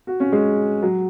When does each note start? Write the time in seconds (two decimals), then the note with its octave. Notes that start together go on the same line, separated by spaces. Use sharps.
0.07 F#4
0.20 C#4
0.32 G#3
0.83 F#3